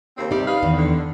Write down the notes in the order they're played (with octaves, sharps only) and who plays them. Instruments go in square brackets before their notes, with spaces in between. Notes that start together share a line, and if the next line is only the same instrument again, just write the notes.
[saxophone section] D#2 C#3 C4
[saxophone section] C3 G3 [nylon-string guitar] D#4 D5
[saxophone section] B4 D#5 F5
[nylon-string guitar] E2 D#3
[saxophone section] D3